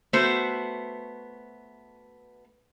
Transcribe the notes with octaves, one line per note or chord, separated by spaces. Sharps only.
A3 B3 F#4 C5